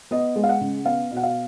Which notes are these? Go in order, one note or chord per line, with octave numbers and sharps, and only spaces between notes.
B3 D#5
G#3
F5
F#5
C#3
B3 F5
B2
F#5
F5